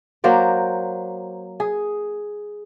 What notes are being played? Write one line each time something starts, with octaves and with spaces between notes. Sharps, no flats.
F#3 A#3 C5 D5
G#4